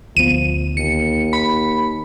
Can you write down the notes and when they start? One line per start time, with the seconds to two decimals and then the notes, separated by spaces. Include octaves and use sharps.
0.17 D2 F3 B3 D#7
0.77 D#2 C#7
1.33 B5